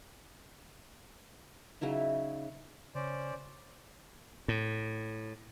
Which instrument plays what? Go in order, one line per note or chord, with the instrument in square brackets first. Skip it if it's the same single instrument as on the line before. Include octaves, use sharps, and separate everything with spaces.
[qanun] C#3 F#3 D#4 E4
[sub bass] C#3 [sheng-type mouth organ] C#4 C5 D5
[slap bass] A2